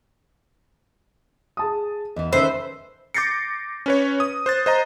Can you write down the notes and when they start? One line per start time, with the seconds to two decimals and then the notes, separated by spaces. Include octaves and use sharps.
1.57 G#4 A5 D#6
2.16 E2 E3 D#5
2.33 D#3 C#4 A4 B4 C5 E5
3.14 D6 G6 A6 A#6 C7 C#7
3.86 C#4 B4 C#5
4.20 D#6
4.46 C5 F#6 A6
4.66 C5 D#5 A#5